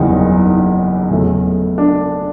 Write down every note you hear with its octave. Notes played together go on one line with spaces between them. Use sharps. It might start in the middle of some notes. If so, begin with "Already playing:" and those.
Already playing: F#1 E2 C#3 E3 G3 D#4
D#4
E2 C#3 F#3 A3
D4